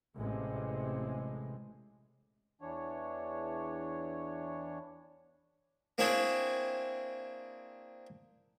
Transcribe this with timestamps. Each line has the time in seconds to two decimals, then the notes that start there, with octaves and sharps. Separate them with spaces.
0.15 A1 C3 G#3
2.61 E2 E3 D4 C#5
5.98 A#3 C4 D4 E4 G#4 C#5